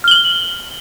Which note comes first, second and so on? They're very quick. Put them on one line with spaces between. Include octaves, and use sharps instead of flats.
F6 G7 F#7